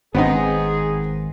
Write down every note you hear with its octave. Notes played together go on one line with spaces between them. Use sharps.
G#1 D#3 B3 C4 D#4 G#4 F#5